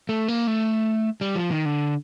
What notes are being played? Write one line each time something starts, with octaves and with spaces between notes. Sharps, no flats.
A3
A#3
A3
G3
F3
D#3
D3